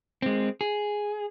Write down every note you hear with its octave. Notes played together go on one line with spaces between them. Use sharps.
G#3 C4
G#4